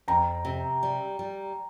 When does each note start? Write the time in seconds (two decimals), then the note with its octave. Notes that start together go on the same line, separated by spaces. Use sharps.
0.08 F2 G5 A#5
0.45 C3
0.83 G3
1.19 G3